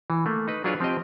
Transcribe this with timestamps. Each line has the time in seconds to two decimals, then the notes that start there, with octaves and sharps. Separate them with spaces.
0.10 E3
0.26 A3 A#3
0.48 D#4 B4
0.64 F#3 D4 F4 G#4 B4 C#5
0.80 F3 C4 G4 D#5